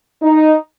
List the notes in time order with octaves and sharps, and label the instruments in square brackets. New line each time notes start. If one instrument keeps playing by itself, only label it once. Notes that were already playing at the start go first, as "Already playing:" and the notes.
[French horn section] D#4